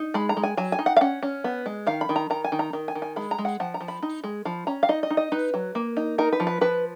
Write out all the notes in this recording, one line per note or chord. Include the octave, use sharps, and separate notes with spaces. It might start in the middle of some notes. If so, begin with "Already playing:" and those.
Already playing: D#4
G#3 B5
A#5
G#3
G#5
F#3 G#5
G#5
D#4
F#5
F5
C#4 F#5
C#4
B3
G#3
D#3 F5
B5
D#3
A#5
D#3 A#5
G#5
D#3
A#5
D#3
G#5
D#3
G#5
G#3 B5
A#5
G#3
F#5
F3 F#5
A#5
F3
B5
D#4
G#3
F3 B5
C#4 A#5
F5
D#4 D#5
D#5
D#4
D#5
D#4 B4
F#3
A#3
D#4
D#4 A#4
B4
F3
B4
F3 B4